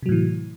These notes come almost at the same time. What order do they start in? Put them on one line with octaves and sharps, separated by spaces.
C3 F#3 A2 E3